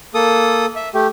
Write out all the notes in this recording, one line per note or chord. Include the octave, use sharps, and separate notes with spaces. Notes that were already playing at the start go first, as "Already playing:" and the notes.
A#3 A4 D#6
E5
A3 G4